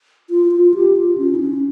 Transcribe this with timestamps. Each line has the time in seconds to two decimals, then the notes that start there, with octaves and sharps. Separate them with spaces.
0.30 F4
0.52 F4
0.74 G4
0.97 F4
1.18 C#4
1.35 E4
1.40 C#4